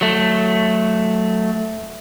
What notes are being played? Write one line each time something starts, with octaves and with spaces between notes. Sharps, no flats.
F#3 A3